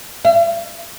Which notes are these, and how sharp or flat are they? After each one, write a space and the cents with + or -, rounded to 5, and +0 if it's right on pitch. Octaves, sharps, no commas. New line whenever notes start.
E5 +45